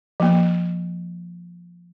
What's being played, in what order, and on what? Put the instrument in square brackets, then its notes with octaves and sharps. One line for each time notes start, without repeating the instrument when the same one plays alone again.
[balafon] F3 A#3